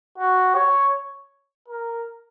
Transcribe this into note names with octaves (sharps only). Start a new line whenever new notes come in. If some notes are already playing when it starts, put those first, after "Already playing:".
F#4
C#5
A#4